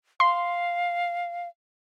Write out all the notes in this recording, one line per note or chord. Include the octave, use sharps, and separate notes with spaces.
F5 C6